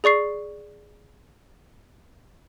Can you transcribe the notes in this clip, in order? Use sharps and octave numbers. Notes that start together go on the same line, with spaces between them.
G#4 D5 C#6 C7